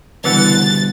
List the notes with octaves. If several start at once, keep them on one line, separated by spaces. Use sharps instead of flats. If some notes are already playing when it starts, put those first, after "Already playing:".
C#2 B2 D3 E3 G3 F#5 A6